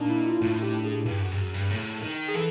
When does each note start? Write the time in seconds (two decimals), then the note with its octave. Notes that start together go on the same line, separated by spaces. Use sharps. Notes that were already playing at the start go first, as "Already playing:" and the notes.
Already playing: A#2 D4 D#4
0.09 E4
0.25 F4
0.41 A2 F4
0.62 G4
0.84 G#4
1.06 G2
1.22 F#2
1.32 G2
1.38 F#2
1.54 G2
1.71 A2
2.02 D#3
2.28 G#4
2.35 E3 A4